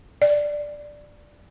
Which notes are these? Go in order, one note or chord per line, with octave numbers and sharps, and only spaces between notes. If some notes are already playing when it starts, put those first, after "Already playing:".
D5